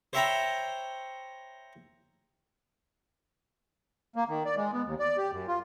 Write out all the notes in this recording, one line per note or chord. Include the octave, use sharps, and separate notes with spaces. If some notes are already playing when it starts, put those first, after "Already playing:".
C5 C#5 E5 G5 A#5 B5
A#3
D#3
D5
G#3
B3
D#2
D5
G4
F#2
F4